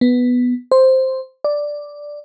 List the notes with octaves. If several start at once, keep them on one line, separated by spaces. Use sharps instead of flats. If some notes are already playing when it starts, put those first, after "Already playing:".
B3
C5
D5